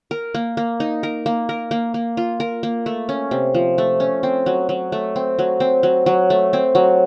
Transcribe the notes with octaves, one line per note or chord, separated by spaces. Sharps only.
A#4
A#3
A#3
D#4
A#4
A#3
A#4
A#3
A#3
F4
A#4
A#3
A3
C#4
C3
F3
A3
C#4
C4
F#3
F#3
A3
C4
F#3
C4
F#3
F#3
A3
C4
F#3